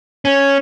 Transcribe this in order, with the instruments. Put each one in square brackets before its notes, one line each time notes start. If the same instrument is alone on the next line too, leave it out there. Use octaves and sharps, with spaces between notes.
[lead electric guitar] C#4